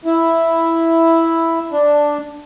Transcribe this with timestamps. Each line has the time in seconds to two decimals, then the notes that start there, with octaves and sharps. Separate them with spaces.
0.05 E4
1.72 D4